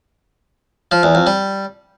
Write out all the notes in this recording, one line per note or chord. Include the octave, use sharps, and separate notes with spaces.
F3
E2
F2
G3